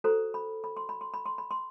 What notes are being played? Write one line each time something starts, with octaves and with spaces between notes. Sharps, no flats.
F#4 A4 C5 A#5
B5
B5
C6
B5
C6
B5
C6
B5
C6